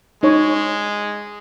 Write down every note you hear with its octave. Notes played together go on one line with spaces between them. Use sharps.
G#3 D#4 C#5